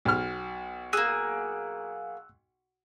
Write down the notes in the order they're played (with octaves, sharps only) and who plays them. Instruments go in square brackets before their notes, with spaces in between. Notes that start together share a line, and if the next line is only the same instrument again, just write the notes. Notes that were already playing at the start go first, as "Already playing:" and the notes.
[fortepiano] B1 F6
[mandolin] A#3 G#4 [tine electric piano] E6 F#6